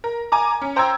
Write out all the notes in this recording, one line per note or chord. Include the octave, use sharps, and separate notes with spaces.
A#4
G#5 A#5 D6
C#4
C5 G5 A#5 C6 E6 G#6